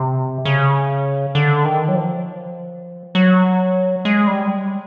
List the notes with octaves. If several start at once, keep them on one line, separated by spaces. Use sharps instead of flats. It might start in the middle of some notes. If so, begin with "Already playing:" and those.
Already playing: C3
C#3
D3
D#3
F#3
F3
F#3
G#3
G3